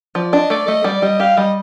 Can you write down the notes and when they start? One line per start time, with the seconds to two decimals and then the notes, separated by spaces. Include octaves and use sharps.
0.15 F3 D5
0.33 D4 D#5
0.50 A3 D5
0.67 A3 D#5
0.84 G3 D5
1.02 G3 D#5
1.20 G4 F5
1.37 G3 D#5